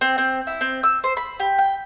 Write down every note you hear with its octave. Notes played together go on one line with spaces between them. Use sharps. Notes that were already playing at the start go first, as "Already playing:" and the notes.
C4
C4
E4
C4
E6
C5
B5
G4
G5